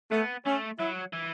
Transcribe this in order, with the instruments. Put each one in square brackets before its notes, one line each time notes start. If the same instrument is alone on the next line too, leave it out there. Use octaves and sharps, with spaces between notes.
[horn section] A3 [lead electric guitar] B3
[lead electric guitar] A3 [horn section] C#4
[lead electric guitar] F#3 [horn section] E4
[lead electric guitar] E3